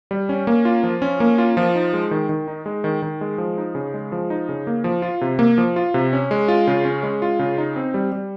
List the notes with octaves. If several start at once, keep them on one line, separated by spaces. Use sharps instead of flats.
G3
C#4
A#3
F4
F3
C#4
A#3
F4
F3
D#4
G#3
D#3
D#3
D#4
G#3
D#3
D#3
G#3
F3
D#4
C#3
G#3
F3
D#4
C#3
A#3
F3
F4
C3
A#3
F3
F4
C3
C#4
G#3
F4
C#3
C#4
G#3
F4
C#3
D#4
C4
G3
G3